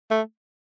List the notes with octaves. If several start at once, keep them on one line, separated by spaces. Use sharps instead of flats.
A3